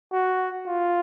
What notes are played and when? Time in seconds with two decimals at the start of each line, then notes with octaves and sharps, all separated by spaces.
0.13 F#4
0.67 F4